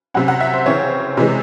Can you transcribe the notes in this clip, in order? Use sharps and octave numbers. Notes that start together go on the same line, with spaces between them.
C3 F#3 C#4 F#5
F#5
E5
C5
C#3 E3 C4 C#5
C3 E3 G#3